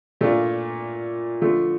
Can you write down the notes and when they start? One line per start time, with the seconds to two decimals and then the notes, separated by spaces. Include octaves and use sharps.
0.21 A#2 A3 D4 F4
1.42 D3 F3 A3